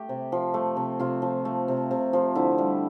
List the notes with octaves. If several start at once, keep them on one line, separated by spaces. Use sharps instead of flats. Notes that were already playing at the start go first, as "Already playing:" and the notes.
Already playing: A3 G4
C3
F3
A3
C3
C3 F4
F3
A3
C3
C3
F3
D3 E4
G3